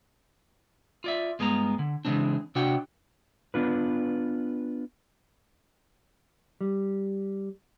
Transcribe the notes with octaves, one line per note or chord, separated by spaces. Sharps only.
F4 D5 E5
G2 G#3 B3 A5 A#5
D3
C#3 E3 G#3 C4 D4
C3 D4 F#4 G5
B3 D4 F4 B4
G3